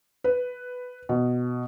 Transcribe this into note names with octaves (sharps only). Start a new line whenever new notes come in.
B4
B2